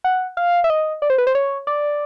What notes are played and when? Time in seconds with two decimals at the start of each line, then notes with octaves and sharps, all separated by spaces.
0.04 F#5
0.37 F5
0.64 E5
0.70 D#5
1.02 D5
1.10 C5
1.18 B4
1.27 C5
1.35 C#5
1.67 D5